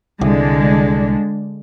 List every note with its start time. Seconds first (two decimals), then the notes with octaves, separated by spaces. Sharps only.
0.21 C2 D3 G#3 D4